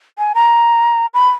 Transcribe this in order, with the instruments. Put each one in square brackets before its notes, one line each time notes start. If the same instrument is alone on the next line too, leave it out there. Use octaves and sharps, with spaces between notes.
[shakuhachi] G#5
A#5
B5